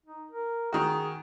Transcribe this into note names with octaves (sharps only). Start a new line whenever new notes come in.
D#4
A#4
D#3 F#4 G#4